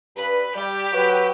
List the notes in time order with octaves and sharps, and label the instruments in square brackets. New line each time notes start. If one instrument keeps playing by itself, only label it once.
[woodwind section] G2 [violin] B4
[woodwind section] G3 [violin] G4
[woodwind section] F#3 B4